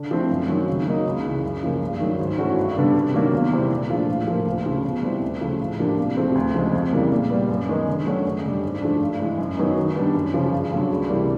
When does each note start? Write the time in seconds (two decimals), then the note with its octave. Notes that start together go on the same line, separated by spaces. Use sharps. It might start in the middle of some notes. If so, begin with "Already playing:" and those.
Already playing: D3
0.11 F3 A3 C4 E4
0.30 F#2
0.49 D#3 F#3 A#3
0.67 C#3
0.86 F#3 A#3 D#4
1.06 C#2
1.25 C#3 E3
1.44 F#2
1.63 C#3 F3 A#3
1.82 G2
2.00 D#3 F#3
2.19 G#2
2.38 E3 A3 C#4 F#4
2.57 G2
2.76 D3 G3 B3 D4
2.95 C3
3.14 D#3 F#3 A#3 D4
3.33 E2
3.51 C3 E3 G3 C4
3.70 A#2
3.90 F3 A3 D4 F4
4.09 A2
4.27 F3 A#3
4.46 D2
4.66 C#3 F3
4.84 B2
5.02 G3 C4 E4
5.22 D2
5.41 C#3 F3 A3
5.60 A2
5.78 F3 A#3 D4 G4
5.98 C2
6.17 C3 F3 A3 C4
6.35 D2
6.54 C#3 F3 G#3
6.73 F2
6.92 C#3 E3 G3 A#3
7.11 A#2
7.30 G3 B3
7.49 F#2
7.69 D#3 G#3 B3 D#4
7.88 D3
8.07 F#3 A3 C#4 F#4
8.26 F#2
8.45 D3 G3
8.63 G#2
8.81 F3 A3 D4
9.01 G2
9.20 E3 G#3
9.38 F#2
9.57 D#3 F#3 B3 D#4
9.77 D#3
9.96 G3 B3 D4
10.15 F#2
10.34 C#3 F3
10.52 G2
10.71 D3 F#3
10.90 C#2
11.09 C3 E3 G3 A#3